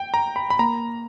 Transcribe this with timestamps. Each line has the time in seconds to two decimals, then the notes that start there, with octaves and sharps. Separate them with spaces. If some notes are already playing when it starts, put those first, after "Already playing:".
Already playing: G5
0.14 A#5
0.36 B5
0.50 B5
0.59 A#3 A#5